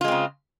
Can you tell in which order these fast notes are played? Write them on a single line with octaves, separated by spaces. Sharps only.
F4 G#3 C4 C#3